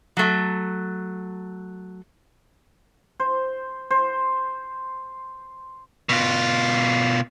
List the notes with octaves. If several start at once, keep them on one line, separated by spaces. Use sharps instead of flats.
F#3 A3
C5
C5
B2 F4